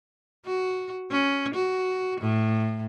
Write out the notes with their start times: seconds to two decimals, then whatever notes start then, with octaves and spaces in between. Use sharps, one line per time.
0.45 F#4
1.11 C#4
1.54 F#4
2.21 A2